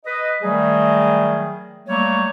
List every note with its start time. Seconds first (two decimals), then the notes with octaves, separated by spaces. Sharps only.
0.05 B4 D#5
0.42 D#3 F#3 G3 A3 G#4
1.87 F#3 G3 A3 A#3 C#5